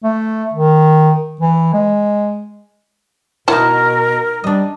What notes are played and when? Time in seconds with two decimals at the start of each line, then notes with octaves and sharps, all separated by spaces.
0.04 A3
0.54 D#3
1.41 E3
1.74 G#3
3.48 B2 D#4 E4 A#4 C#5 F#5 A5
4.44 G3 D4 D#5